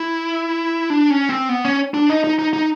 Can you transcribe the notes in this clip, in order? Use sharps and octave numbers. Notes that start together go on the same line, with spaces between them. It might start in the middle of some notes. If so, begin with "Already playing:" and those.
Already playing: E4
D4
C#4
C4
B3
C#4
D4
D#4
D#4
D#4
D#4